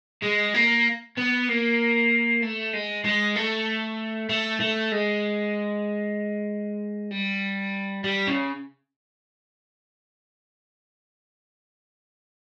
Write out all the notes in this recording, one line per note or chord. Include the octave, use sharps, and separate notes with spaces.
G#3
A#3
B3
A#3
A3
G#3
G#3
A3
A3
A3
G#3
G3
G3
C#3